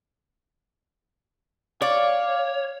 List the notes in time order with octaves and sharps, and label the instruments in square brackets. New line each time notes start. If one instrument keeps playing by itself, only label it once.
[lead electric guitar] C#5 [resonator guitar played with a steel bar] D5 [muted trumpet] F5